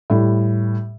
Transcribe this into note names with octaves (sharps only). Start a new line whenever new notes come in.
A2 G3